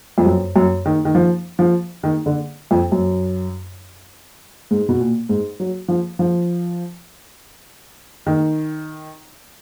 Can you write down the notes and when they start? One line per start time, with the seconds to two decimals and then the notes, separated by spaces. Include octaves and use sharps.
0.18 F2
0.26 F#2
0.56 F#2
0.86 D#3
1.05 D#3
1.15 F3
1.59 F3
2.03 D#3
2.26 D3
2.71 F2
2.92 F#2
4.71 G#2
4.89 B2
5.00 A#2
5.29 G#2
5.60 F#3
5.88 F3
6.19 F3
8.27 D#3